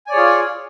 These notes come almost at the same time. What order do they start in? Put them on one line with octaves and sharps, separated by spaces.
G#5 D5 C#5 G#4 F4